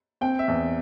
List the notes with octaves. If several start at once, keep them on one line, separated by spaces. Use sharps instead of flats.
C4 G5
E5
E2